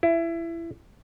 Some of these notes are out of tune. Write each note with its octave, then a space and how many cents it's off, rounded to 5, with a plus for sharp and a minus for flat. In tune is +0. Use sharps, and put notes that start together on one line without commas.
E4 +20